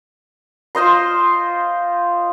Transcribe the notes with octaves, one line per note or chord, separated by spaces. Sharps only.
F4 C5 D#5 C6